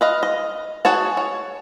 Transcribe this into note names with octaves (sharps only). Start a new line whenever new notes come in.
B4 D#5 F5
D#5
F#4 G#4 C#5 A5
C#5